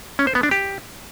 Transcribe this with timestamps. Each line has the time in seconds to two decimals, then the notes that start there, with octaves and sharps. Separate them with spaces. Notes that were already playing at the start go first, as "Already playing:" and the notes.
0.19 C#4
0.27 C5
0.35 B3
0.43 D4
0.51 G4